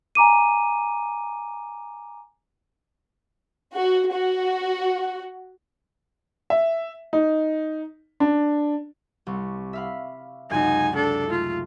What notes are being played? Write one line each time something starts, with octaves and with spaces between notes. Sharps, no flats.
G#5 A#5 D6 D#7
F#4
F#4
E5
D#4
D4
C2 C#6
E5 F5 B5
C#2 F#2 C3 D#4 G#5
D4 A4
A3 D#4 F4